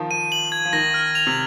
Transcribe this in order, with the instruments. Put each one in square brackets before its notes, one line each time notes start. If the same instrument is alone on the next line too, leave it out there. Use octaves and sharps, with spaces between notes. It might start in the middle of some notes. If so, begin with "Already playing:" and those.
Already playing: [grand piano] D#3 F3
[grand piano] F3 [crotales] D#7
[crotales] F#7
G#6
[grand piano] F3
[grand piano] D#3 [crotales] A#6
[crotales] F6
F7
[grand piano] C3